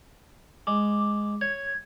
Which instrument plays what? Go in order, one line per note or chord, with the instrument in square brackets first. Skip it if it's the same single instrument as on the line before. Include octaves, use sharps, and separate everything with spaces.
[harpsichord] G#3 [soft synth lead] D6
[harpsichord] C#5 [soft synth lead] G#6